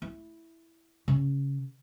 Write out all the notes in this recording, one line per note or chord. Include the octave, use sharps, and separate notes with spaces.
E4
C#3